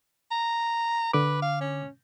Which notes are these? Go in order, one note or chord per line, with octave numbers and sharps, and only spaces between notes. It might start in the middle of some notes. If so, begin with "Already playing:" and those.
A#5
D3 B4 D6
F5
C#4